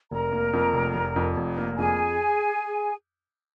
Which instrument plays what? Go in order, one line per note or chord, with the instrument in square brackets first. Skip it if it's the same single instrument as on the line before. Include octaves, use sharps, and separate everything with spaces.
[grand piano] F1 [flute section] A#4 A#5
[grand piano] A#3
F2
F1
F1
F2
F1
A#3
[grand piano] F2 [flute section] G#4 G#5